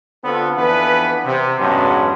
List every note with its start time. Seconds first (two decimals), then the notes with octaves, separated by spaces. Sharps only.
0.24 D3 B3 C4 F4 A4 B4
0.58 F2 E3 B3 D4 B4
1.25 C3
1.60 E2 G2 F#3 G#3 B3 C#4